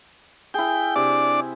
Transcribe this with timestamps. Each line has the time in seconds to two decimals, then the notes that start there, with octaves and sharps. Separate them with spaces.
0.54 E4 G#4 G5
0.96 C3 D4 D5